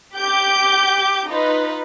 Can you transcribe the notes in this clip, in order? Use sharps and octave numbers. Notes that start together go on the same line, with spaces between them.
G4 D6 G6
D#4 F4 B4